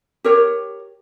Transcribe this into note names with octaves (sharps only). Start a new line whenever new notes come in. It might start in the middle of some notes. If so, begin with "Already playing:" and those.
G4 A#4 C#5